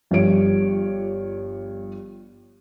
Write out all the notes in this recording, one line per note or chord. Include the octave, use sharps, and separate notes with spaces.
G1 G2 F3 G3 C#5 D7